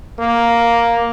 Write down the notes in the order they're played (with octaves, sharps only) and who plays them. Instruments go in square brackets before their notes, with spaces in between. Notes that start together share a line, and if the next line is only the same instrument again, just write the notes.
[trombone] A#3